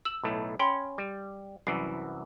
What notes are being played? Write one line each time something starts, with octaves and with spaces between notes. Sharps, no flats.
E6 E7 F#7
B1 A2 A3
C#4 G5 B5 C6
G3
C2 F#2 E3 C7